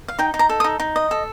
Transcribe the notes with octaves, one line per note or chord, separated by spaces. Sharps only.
F5
D#4 G5
D#4
A#5
A4
D#6
D#4
D#4
D#5
A4